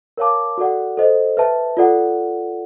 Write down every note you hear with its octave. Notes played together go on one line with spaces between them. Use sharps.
A#4 C#5 F5 A5 D6
F#4 A4 D5 F#5
A4 C5 D#5
B4 E5 A5
F4 A4 D5 F#5